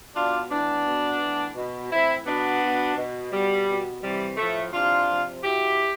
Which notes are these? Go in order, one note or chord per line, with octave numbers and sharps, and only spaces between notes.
B2 D4 F4
A2 E3 B3 D4
B2
A2 E3
B2
A2 E3 C4 E4
B2 B3 D4
B2
B2
B2 G3
B2
C3 E3 G3
A2 F3 A3
C3 E3 D4 F4
C3 F3
B2 E4 G4